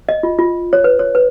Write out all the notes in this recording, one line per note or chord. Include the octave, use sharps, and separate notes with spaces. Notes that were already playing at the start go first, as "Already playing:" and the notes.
D#5
F4
F4
C#5
B4
C#5
B4